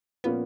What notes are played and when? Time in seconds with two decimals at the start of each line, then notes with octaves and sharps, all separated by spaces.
0.24 A#2 F3 A#3 B3 C#4